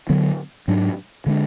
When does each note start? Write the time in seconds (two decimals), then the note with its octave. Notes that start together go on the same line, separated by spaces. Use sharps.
0.09 D3 F#3 B3
0.68 G#2 F#3 D4
1.26 D3 G#3 D4